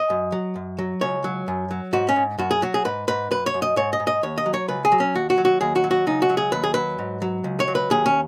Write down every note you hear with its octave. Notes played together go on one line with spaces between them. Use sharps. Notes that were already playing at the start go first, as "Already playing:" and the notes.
Already playing: D#5
F#2
F#3
F#2
F#3
C#2 C#5
F#3
F#2
F#3
G#2 F#4
C#4
G#2
F#2 F#4
G#4
F#3 F#4
G#4
G#2 B4
G#2 B4
F#2 B4
C#5
F#2
D#5
G#2 C#5
D#5
G#2
D#5
D#2 C#5
D#5
F#3
C#5
C#2 B4
G#4
F#3
C#4
D#2 F#4
F#4
F#3
F#4
D#2 G#4
F#4
F#3
F#4
C#2 D#4
F#4
F#3
G#4
D#2 B4
G#4
F#3 B4
G#2
F#3
C#2
C#5
F#3
B4
D#2 G#4
C#4